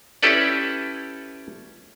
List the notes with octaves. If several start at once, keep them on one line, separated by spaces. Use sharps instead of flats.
C#4 E4 G4 A4 B4 D5